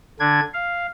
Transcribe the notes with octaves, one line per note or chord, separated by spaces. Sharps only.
D3 D4 G#6
F5